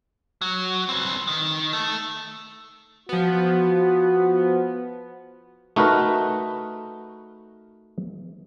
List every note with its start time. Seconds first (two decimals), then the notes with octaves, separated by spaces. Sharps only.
0.41 F#3
0.89 C4 B4
1.27 D#3
1.73 A3
3.09 F3 B3 F#4
5.76 A3 D#4 F#4 A#4 B4